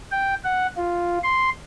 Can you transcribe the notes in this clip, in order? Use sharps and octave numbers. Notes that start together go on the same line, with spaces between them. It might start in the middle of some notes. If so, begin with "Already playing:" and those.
G5
F#5
F4
C6